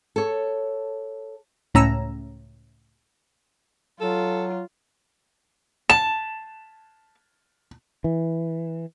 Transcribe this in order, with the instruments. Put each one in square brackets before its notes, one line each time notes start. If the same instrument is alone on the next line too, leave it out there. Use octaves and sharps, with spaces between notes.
[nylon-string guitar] A4 C#5
[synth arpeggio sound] C#2 A2 C#4 A#5 E6
[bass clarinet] F#3 [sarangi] F4 [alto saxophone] A4
[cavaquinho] A5 [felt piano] E7
[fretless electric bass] E3